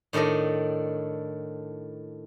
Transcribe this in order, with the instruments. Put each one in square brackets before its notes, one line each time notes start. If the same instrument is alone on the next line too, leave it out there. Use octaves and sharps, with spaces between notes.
[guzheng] A2 D#3 D4 A4 D#5